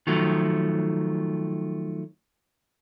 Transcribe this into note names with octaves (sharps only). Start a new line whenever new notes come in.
D#3 F3 F#3 A3